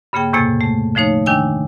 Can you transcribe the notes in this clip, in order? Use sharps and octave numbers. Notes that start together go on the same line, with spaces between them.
G2 C#3 A#3 G#4 G5
E2 A2 C3 A#3 G#6 A6
A3
D3 F3 A3 D#4 C#5
D#3 D4 G5 G#5 E6